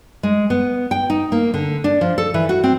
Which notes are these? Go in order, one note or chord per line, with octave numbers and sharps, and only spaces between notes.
G#3
B3
G5
D#4
A#3
D3
D4
F3
A4
E3
F#4
C4